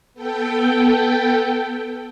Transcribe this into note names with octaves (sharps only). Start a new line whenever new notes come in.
B3 A4 G5